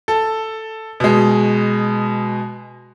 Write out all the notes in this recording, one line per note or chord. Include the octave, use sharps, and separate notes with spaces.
A4
B2 G#3